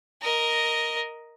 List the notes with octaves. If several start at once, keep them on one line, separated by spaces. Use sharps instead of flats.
A#4 D#5